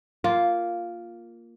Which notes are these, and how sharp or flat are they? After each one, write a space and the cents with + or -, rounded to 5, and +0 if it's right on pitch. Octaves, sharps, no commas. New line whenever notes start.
A#3 +0 F4 +0